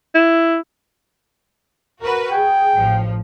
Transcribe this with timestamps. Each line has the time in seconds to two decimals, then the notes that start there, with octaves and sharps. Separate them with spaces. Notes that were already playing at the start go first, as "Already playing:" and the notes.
0.15 E4
2.02 F#4 A#4 B4
2.31 G#4 G5
2.76 A1 F3